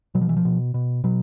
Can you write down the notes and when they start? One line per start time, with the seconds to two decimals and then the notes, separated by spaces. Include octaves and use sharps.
0.15 B2 F#3
0.21 F3
0.29 E3
0.37 F3
0.45 B2
0.74 B2
1.04 B2 F#3